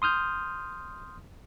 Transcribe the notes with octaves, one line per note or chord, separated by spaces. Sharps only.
C6 D#6 F6 G6